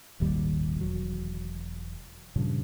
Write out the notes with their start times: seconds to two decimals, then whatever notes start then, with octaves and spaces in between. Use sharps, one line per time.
0.20 D#1 G#1 D#2 G3
0.81 E1 F#3
2.36 G2 A#2 C#3 F3